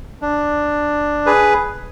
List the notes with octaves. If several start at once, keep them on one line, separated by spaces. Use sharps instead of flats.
D4
G#4 B4